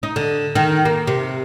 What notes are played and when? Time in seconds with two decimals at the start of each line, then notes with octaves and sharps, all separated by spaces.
0.03 D#4
0.16 D3
0.55 D#3
0.85 A#3
1.07 C3